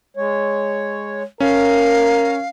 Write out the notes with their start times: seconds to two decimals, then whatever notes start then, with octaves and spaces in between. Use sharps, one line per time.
0.17 G#3 C#5
1.40 C#4 A#4 F5 A#5